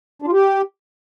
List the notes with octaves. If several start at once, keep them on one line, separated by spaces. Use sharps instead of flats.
D4
F4
G4